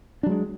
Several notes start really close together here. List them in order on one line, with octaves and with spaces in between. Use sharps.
D4 F#3 G#3